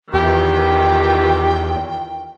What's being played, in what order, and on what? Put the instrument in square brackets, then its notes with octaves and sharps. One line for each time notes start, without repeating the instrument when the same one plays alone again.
[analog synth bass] E2 [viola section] D#3 E3 F4 [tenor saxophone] G4 [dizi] G5